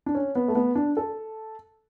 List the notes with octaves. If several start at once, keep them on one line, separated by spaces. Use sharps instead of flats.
D4
C#4
B3
A3
B3
D4
A4